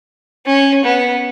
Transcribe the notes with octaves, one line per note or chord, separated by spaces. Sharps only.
C#4
B3